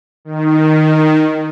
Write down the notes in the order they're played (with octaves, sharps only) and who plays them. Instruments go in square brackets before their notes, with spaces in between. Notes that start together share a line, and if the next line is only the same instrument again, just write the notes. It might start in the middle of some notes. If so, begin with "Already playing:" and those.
[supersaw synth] D#3